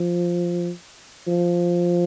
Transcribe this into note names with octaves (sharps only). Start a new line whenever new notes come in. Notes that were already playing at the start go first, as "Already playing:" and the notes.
Already playing: F3
F3